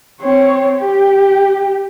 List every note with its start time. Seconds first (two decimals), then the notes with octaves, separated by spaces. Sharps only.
0.22 C4 C#5
0.79 G4